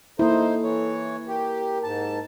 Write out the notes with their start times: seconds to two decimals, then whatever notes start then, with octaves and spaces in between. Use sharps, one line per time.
0.19 A#3 D#4 E4 A4 C5
0.63 E3 C#5
1.28 G4 A#4
1.84 G#2 A5